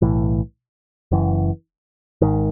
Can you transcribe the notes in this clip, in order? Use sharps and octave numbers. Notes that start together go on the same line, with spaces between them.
B1 A2 E3
F#1 F#2 E3
G#1 G#2 D#3